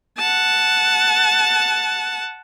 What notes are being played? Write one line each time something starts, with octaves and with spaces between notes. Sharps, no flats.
F#5 A5